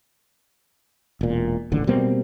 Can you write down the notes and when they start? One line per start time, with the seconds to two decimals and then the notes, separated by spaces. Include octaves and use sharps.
1.21 E1 A#2
1.72 D#1 A1 D3
1.87 B2 G3 A#3 C4